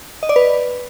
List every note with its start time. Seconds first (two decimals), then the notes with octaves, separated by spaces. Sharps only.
0.23 D#5
0.29 D5
0.36 B4